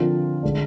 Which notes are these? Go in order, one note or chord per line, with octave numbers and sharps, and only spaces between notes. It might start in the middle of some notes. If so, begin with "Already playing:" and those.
Already playing: D3 F3 C4 F4 A#4
D3 G#3 D4